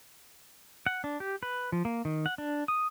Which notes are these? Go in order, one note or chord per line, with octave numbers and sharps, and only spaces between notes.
F#5
D4
G4
B4
F3
A#3
D#3
F#5
D4
D#6